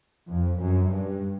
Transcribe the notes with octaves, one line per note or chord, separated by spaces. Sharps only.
F2
F#2
G2